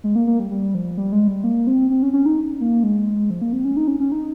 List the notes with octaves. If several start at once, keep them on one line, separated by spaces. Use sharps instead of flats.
G#3
A#3
A#3
G3
G3
F3
G3
G#3
G3
A#3
C4
C4
C#4
C#4
D#4
A#3
G#3
F3
A#3
C4
C#4
D#4
C#4
C#4
D#4